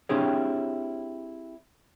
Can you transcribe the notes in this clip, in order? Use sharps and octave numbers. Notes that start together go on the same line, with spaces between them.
C4 D4 E4 G4 G#4 C#5